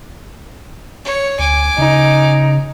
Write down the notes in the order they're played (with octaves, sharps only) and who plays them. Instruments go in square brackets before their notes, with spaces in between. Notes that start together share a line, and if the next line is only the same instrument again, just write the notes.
[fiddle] C#5
[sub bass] D2 [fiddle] G#5 D6
[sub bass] C#3 [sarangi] D#4